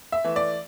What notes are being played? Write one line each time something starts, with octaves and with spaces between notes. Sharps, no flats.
E5
E3 A3
D5